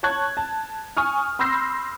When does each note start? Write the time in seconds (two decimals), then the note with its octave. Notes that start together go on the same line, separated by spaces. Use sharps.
0.03 C#5 A5 C#6 F#6 G#6
0.37 A5
0.97 G#5 C#6 D#6 F6
1.39 B5 C6 E6 G6 A#6 C7